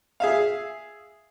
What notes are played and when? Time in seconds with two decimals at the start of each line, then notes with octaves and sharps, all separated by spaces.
0.20 G#4 E5 F5